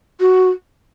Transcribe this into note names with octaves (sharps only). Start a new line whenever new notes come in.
F#4